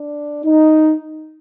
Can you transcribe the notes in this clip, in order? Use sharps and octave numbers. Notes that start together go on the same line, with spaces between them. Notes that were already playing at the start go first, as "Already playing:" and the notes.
Already playing: D4
D#4